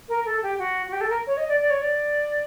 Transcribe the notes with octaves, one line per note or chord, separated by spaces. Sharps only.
A#4
A4
G4
F#4
F#4
G4
A4
A#4
C#5
D#5
D5
D5
C#5
D5